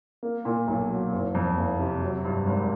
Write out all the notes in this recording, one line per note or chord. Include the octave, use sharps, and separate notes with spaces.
A#3
A#2
B1
F#3
F#1
F2
F#1
C3
F#3
G2
G#1